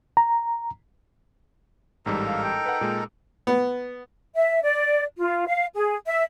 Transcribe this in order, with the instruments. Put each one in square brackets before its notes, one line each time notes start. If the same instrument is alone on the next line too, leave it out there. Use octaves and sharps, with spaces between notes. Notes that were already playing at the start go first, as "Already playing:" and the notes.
[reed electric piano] A#5
[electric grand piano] A1 G#2 G3 [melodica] D#4 A4 A#4
[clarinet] F5
G5
[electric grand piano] B4 F#5
A#2 G#3
[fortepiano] B3
[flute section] E5
D5
F4
F5
G#4
E5